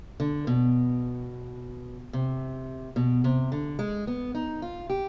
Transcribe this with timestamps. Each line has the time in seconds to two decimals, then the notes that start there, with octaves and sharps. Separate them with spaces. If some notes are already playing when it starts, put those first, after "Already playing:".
0.20 D3
0.47 B2
2.13 C3
2.96 B2
3.24 C3
3.52 D3
3.79 G#3
4.07 B3
4.35 D#4
4.62 F4
4.90 G4